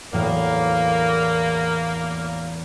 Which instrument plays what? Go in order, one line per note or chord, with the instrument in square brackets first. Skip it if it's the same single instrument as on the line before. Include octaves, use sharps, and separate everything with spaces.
[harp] E2 A2 F#3 [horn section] A#3